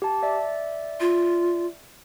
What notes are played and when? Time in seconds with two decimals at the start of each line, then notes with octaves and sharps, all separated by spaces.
0.02 G4 A5
0.23 D5 E5
1.00 F4